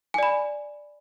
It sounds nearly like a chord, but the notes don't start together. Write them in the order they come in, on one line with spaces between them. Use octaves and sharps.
G#5 D5 B5